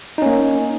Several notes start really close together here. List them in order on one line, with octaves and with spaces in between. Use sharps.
D#4 C#4 A#3